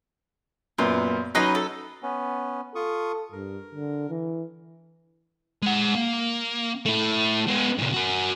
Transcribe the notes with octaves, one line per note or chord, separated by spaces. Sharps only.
F#2 A#2 B3 F4
F#3 C#4 D#4 B4 D#5 C6
A4
B3 C#4
F4 A4 C#6 D#6
G2 A#4
D3
E3
G#3 F#5
A#3
A3 E4
G#3 B3
A#2 C#3
F#4 A#4